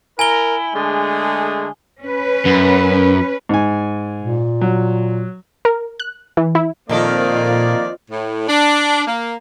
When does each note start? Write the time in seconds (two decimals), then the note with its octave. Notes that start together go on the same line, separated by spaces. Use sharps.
0.19 E4 A#4 G#5 G7
0.75 D3 G#3 A3 G#4
2.02 C#4 B4
2.45 F#2
3.49 G#2 G#5
4.23 A#2
4.61 F#3
5.65 A#4
6.00 F#6
6.37 E3
6.55 E4
6.89 F2 A#2 D#3 A#3 C4 F4 A4 D5
8.10 A2
8.48 D4
9.07 A#3